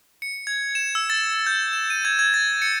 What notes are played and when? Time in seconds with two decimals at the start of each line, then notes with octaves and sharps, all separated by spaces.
0.22 C#7
0.47 G#6
0.75 E7
0.95 E6
1.10 A6
1.46 G6
1.73 E7
1.90 D#7
2.05 G#6
2.19 G#6
2.34 A6
2.62 C#7